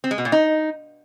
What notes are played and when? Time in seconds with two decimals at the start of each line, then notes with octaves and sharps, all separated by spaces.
0.04 C4
0.11 G#3
0.18 B2
0.25 A#2
0.32 D#4